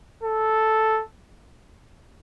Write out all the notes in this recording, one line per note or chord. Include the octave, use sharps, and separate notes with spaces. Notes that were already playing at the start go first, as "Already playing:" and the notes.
A4